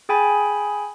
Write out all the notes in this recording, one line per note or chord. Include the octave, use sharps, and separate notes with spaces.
G#4 G5 G#5 B5